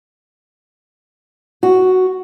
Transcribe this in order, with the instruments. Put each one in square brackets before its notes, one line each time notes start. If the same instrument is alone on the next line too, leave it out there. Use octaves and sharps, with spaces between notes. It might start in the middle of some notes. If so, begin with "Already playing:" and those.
[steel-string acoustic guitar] F#4